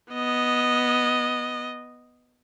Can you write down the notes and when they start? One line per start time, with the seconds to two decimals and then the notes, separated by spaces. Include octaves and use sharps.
0.12 B3 D#5